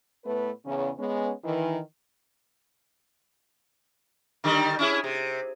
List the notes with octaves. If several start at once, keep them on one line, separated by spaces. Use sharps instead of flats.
A2 A3 B3 B4
E2 C#3 C#4
G#3 B3 C#4
D#3 E3
D3 D#3 G3
C#4 E4 G#4
C3